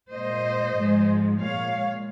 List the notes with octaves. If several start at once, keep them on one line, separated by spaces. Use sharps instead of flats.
A#2 G#3 C5 D#5
G#2 F3 G#3
A#2 G#3 C#5 F5